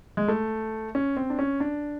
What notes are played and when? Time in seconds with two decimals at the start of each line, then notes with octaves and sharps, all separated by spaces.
0.17 G#3
0.28 A3
0.95 C#4
1.17 C4
1.30 D4
1.39 C#4
1.60 D4